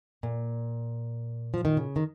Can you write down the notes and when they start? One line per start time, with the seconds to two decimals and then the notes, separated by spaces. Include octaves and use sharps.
0.23 A#2
1.54 F3
1.65 D#3
1.77 C#3
1.96 D#3